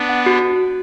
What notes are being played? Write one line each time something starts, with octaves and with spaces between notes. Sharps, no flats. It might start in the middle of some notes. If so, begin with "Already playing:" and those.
Already playing: B3 D4
F#5
F#4